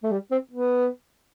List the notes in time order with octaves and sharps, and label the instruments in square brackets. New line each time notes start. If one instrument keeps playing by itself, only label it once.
[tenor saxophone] A3
G3
C4
B3